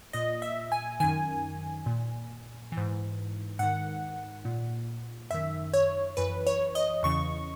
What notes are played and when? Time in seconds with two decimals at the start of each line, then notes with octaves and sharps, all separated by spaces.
0.13 A#2 D#5
0.42 E5
0.72 G#5
1.00 F#2 D#3 G#5
1.86 A#2
2.72 E3
2.77 G#2
3.59 G#2 D#3 F#5
4.45 A#2
5.31 F#2 D#3 E5
5.74 C#5
6.17 F#2 E3 B4
6.47 C#5
6.75 D#5
7.03 E2 C#3 E3 C#6